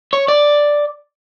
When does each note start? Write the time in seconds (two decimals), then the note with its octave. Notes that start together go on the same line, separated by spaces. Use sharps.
0.13 C#5
0.28 D5